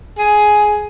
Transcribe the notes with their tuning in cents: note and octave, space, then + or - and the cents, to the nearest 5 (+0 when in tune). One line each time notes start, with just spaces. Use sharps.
G#4 +10